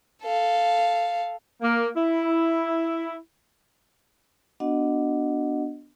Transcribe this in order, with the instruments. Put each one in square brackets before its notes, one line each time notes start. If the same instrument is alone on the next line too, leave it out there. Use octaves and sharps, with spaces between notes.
[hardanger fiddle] A4 F5
[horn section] A#3
E4
[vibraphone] B3 D4 F#4 D#5 F#5